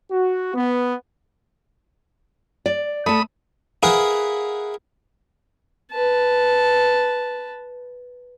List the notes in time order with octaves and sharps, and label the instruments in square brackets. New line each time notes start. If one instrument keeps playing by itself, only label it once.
[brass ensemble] F#4
B3
[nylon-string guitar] D5
[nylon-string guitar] A3 A5 [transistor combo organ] B5 D#6
[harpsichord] E4 G#4 A#4 B4 F5 F#5
[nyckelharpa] B4 A5